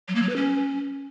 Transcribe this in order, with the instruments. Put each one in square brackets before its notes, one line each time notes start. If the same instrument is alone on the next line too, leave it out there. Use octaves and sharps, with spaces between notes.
[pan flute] F#3
A#3
F#3
B4
C#4